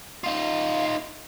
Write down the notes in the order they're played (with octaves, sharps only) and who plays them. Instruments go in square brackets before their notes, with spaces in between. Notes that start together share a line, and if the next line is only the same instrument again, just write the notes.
[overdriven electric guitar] D#4 F4 [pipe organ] F5